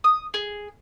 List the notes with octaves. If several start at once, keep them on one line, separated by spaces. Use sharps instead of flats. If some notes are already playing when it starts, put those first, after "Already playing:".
D#6
G#4